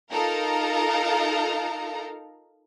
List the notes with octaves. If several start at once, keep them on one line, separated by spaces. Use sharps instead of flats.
D#4 F4 A4 A#4 F5 A#5